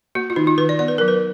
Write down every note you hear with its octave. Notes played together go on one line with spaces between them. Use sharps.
A#3 F#4
F4
D#3 D#4
F4
D#3 B4
D5
B3 D5
B4
F#3 A#4
B4